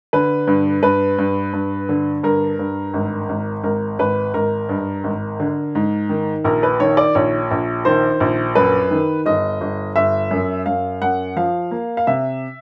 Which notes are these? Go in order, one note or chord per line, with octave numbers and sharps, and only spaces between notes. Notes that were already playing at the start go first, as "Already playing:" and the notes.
D3 B4
G2
G2 B4
G2
G2
D3
G2 A#4
G2
G#1
G#1
G#1 A#4
G#1 B4
G#1 A#4
G2
G#1
D3
G#2
D#3
A#1 A#4
B4
D#3 C#5
D5
A#1 C#5
A#1
D#3 C5
A#1
F#2 B4
D#3
G1 D#5
G1
G1 E5
F#2
F#2 F5
F#2 F#5
F3 F5
A#3
F5
C3 E5